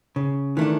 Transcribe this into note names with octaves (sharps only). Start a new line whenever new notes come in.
C#3
D#3 E3 A3 D4